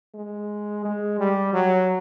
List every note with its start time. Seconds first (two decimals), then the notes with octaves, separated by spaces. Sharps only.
0.14 G#3
0.84 G#3
1.19 G3
1.53 F#3